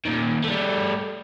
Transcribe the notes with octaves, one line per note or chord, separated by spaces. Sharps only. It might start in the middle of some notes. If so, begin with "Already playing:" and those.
A#2 D#3
G3 A3